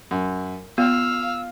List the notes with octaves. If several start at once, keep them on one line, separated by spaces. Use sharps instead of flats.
F#2
B3 F4 F5 E6